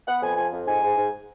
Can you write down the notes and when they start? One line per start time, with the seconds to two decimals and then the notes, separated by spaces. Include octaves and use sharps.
0.07 B3 F#5
0.22 F2 G#5
0.36 F3 G#5
0.52 F2
0.67 G#2 G#5
0.82 G#2
0.97 G#2